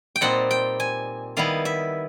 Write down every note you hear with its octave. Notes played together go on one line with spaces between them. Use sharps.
G5
A#2 G3 C4 D#4 F#5
G5
G#5
D#3 G3 B3 E4 F5
E5